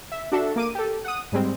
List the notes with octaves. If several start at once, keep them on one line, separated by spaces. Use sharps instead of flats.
E5
D4 F#4 A4 E5
A#3 D6 D#7
G4 A4
F#5 D#6
G#2 G3 G#3 C4